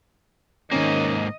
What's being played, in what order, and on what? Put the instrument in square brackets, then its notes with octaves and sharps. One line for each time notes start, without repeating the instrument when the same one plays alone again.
[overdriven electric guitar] G#2 A#3 [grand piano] D#3 C#4 [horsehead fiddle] D#5